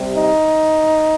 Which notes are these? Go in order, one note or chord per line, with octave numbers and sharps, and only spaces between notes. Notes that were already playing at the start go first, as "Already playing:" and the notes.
Already playing: C3 G3
D#4